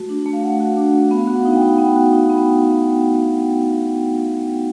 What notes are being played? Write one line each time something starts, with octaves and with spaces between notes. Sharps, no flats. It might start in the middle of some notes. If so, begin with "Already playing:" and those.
Already playing: A3 F#4
D4
A3
F5
A3 F#5
F#4
D4
A3
B3 F5
F#4
F#5
D#4
G5
B3
G5
B3 F#5
F#4
D#4
B3